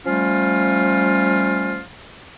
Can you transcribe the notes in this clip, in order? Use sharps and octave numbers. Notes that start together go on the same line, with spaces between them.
F3 G3 A3 C#4 F4